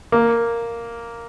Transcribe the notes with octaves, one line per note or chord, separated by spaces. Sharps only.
A#3